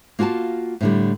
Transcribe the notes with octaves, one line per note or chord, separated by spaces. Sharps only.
A#3 F4 F#4 G#5 A5
A2 D3 G3